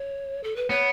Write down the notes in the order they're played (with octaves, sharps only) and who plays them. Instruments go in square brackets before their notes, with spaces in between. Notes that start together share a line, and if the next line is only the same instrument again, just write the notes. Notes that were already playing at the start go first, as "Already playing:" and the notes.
Already playing: [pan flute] C#5
A4
B4
[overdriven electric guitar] B3 [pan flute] C#5